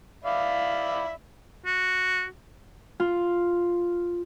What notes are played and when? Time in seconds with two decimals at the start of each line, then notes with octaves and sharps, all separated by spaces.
0.24 D5 E5 F5 B5
1.66 F#4
3.00 F4